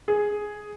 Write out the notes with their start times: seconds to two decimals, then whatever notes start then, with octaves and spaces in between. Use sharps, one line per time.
0.08 G#4